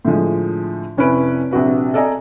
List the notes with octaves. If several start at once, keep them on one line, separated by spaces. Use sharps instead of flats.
A2 D3 F3 G#3
F1 C#4 E4 B4 D7
A#1 C3 F#4 B4
A4 D5 D#5 G#5 A#5